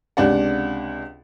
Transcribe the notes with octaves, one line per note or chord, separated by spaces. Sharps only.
C#2 C3 D4 D5 F#5